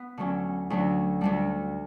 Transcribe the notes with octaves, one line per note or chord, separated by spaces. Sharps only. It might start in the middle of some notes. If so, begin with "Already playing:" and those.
Already playing: B3
D2 D3 F#3 C#4
D2 D3 F#3
D2 D3 G3 D4